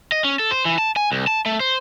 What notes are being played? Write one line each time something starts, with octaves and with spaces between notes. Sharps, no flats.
D#5
C#4
A4
C5
E3
A5
G#5
C2
A5
A3
C5